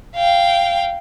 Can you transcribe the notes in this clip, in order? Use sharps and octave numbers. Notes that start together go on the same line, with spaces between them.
F5 G5